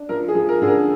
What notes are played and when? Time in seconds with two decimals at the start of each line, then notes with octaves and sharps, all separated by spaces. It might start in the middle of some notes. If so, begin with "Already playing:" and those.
Already playing: D4
0.09 F3 A#4
0.28 G#4
0.35 F3
0.49 A#4
0.62 D3 G#4
0.68 A#4